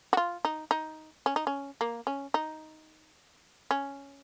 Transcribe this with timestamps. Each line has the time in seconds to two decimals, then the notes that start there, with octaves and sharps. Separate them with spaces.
0.13 F#4
0.17 F4
0.45 D#4
0.71 D#4
1.26 C#4
1.36 D#4
1.47 C#4
1.81 A#3
2.07 C#4
2.34 D#4
3.71 C#4